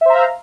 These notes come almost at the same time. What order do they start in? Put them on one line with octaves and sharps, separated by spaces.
E5 C5 A#5 F5